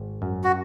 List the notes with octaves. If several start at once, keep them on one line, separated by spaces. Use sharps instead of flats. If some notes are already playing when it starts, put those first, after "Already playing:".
Already playing: G#1
F#2
F#4